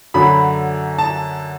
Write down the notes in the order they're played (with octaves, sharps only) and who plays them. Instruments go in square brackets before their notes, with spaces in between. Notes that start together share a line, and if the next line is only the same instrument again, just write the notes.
[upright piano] F#2 D3 F#3 B5
A5